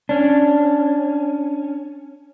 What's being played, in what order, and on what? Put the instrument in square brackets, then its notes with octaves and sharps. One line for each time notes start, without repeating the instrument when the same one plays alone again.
[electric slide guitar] C#4 D4